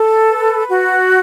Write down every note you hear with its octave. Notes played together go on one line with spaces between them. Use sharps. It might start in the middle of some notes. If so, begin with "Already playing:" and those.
Already playing: A4
B4
F#4